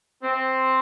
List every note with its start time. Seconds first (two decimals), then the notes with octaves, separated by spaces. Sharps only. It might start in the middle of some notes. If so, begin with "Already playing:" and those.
0.23 C4